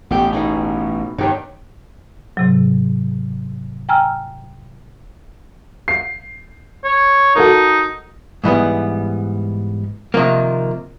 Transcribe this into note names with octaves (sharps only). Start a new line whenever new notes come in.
A1 B3 G4
B2 D#4 G#4
G2 D#3 D#4 G4 C#5
G#2 C3 F#3
G5 G#5 A#5 E6 F6
C7
C#5
D#4 F#4 A4 A#4
G#2 E3 G3 B3
C3 D#3 F3 A#3